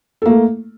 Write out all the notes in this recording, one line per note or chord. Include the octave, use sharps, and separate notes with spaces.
A3 A#3 A4